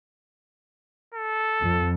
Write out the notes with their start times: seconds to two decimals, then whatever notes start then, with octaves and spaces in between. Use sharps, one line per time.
1.14 A4
1.63 F2